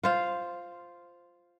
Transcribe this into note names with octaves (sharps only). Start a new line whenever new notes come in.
F4 C5 F5